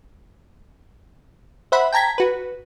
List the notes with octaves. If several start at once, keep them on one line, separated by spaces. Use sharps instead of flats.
C5 E5 F#5 B5
G5 A5 A#5 G#6 B6
F#4 B4